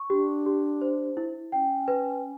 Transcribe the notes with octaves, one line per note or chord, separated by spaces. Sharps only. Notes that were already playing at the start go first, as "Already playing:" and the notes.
Already playing: C#6
D4 G4
G4
C5
E4
C#4 G5
B4